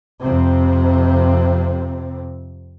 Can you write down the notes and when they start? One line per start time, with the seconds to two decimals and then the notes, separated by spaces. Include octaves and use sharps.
0.23 F2 C3 C4